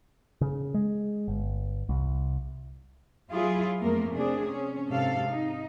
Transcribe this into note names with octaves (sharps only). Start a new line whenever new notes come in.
C#3
G#3
G1
C2
F#3 E4 F4 G#4
F2 A3 A#3 A#4
C3 D4 G#4
C#4
G#2 C3 A4 F5
D#4